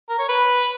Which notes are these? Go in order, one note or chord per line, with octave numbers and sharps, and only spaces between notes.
A#4
C#5
B4